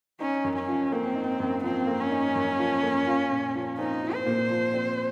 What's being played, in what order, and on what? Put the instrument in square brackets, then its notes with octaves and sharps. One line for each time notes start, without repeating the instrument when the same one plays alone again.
[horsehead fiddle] C#4 [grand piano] D#4
[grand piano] F#2
[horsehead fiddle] C#4
[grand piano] F3
[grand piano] A#3 [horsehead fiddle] C4
[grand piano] D#4
F#2
[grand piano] F3 [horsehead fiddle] C4
[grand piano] A#3
[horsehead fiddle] C#4
[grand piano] D#4
F#2
F3
A#3
F4
A#2
F3
[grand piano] C4 [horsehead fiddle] D#4
[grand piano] F4
[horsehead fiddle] C5
[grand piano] A#2
F3
C4